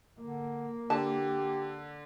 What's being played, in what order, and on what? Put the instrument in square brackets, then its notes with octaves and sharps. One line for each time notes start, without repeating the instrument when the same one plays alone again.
[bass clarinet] D3 [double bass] A#3
[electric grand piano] D3 [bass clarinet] G4 [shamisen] A5